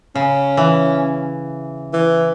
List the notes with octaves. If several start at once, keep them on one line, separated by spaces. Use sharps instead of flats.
C#3 C#4
E3
E3